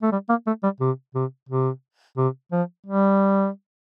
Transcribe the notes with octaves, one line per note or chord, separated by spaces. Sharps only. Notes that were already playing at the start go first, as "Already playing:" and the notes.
A3
G3
A#3
A3
G3
C3
C3
C3
C3
F3
G3